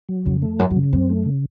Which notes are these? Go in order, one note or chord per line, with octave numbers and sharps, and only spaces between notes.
F#3
F2 C#3
A3
F#2 F#3
F#2
C#3
F#2 C4
A3
C#3